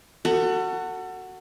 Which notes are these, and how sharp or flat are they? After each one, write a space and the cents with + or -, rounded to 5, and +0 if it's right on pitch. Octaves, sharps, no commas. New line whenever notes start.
F#4 +5 A4 +35